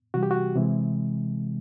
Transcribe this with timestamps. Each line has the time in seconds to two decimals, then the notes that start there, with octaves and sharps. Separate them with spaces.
0.14 C3 E3 G3 F#4
0.23 G4
0.31 F#4
0.56 C3 E3 G#3